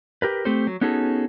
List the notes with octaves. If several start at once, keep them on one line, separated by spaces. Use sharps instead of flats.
G4 A#4 B4
A3 C4 G4 A4 C5
F#3
B3 C#4 D#4 F#4 G#4 A4